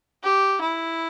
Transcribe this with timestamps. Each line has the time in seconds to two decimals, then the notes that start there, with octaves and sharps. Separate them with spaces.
0.24 G4
0.61 E4